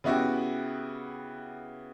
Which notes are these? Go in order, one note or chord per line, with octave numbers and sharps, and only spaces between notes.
C#3 B3 E4 F#4 G4